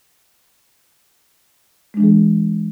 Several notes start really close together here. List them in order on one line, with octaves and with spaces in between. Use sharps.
G#3 D4 E3 G#4